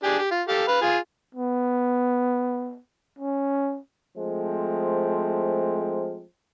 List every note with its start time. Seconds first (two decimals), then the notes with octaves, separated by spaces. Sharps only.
0.04 D4 G4 G#4
0.19 G4
0.31 F4
0.48 G4 A4 F5
0.68 B4 F5
0.82 F4 G#4
1.35 B3
3.19 C#4
4.17 F3 G#3 A3 C4